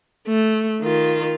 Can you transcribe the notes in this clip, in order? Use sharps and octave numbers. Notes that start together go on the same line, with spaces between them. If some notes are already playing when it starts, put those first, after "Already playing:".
A3
D#3 F4